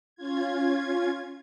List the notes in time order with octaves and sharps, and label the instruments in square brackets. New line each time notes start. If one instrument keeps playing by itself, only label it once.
[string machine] C#4 F4 G#6